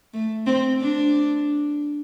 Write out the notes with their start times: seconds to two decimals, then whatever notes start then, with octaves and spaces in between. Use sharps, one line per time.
0.14 A3
0.46 C4
0.81 D4